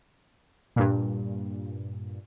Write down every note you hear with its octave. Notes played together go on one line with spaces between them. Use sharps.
G2 A#2